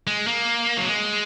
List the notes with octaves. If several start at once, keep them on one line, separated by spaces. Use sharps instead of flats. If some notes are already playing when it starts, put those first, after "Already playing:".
G#3
A#3
F#3
G#3